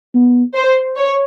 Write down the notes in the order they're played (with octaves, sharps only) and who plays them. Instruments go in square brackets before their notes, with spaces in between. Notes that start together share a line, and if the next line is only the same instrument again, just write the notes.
[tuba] B3
[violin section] C5
C#5